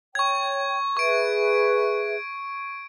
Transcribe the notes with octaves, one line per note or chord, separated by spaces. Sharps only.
C#5 G5 C#6 G#6
G#4 B4 E5 C#6 D7